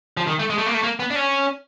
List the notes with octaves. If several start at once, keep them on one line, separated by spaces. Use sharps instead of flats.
F3
D#3
A3
G#3
A3
A#3
A3
A#3
B3
D4
C#4